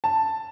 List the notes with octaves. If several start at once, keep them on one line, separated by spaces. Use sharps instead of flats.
A5